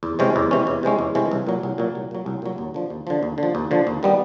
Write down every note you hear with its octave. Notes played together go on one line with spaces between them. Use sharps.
E2
C3 E3 G#3 C#4
E2
C3 E3 G#3 C#4
E2
C3 E3 G#3 C#4
E2
C3 E3 G#3 C#4
C2
A#2 F#3
C2
A#2 F#3
C2
A#2 F#3
C2
A#2 F#3
D#2
D3 F3
D#2
D3 F3
D#2
D3
F3
D#2
D3 F3
D#2
D#3 G3 B3